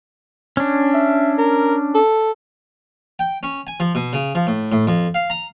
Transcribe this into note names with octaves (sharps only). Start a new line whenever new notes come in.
C#4 D4
E5
A#4
A4
G5
C#4
G#5
F3
B2
C#3
F3
A2
A2
F2
F5
A#5